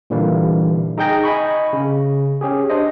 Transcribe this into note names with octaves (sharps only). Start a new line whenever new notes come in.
A#2 D3 E3 G3 A#3
D#4 G#4 G5 G6 A#6
D#5 G#5 B5 C#6
C#3
C#4 G4 G#4
D4 C5 D#5